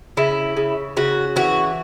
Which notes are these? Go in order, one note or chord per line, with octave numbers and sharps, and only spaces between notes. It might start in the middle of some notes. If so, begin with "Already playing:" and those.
C#3 E4
C#3
C#3 F#4
E3 F#4